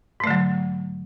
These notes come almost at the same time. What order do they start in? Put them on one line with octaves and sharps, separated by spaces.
G#2 A3 D3 F#3